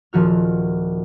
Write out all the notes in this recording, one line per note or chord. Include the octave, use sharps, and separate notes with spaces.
D#1 F3 F#4 F6